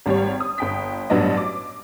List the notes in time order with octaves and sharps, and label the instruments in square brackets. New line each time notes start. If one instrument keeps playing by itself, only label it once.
[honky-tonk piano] G#1 G3 G4 C#5
D#6
G1 G5 B6
A1 G2 F#3 B3 D4 D#5
D6